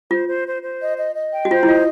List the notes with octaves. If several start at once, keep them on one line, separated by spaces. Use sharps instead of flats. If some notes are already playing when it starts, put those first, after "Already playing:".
F4 C5
C5
C5
C5
D#5
D#5
D#5
G5
F#4
F4 C5
E4
F4 D#5